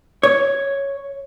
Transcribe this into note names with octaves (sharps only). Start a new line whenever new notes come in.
C#5